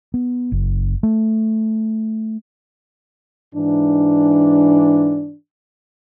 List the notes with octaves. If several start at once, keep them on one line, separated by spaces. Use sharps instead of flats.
B3
F#1
A3
G#2 E3 D4